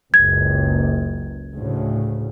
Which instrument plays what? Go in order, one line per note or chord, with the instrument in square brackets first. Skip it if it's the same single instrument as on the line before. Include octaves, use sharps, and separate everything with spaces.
[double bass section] F#1 C#2 [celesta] G#6
[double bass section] D2 A2 C#3